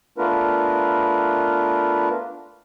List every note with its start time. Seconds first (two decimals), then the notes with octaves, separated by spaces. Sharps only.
0.18 A3 B3 D4 F4 A#4 B4